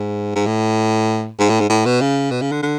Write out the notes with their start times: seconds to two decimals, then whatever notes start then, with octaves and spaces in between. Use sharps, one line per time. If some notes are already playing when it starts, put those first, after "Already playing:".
Already playing: G#2
0.36 G#2
0.46 A2
1.39 G#2
1.50 A2
1.60 G#2
1.70 A2
1.85 B2
2.01 C#3
2.31 B2
2.41 C#3
2.52 D3
2.62 D3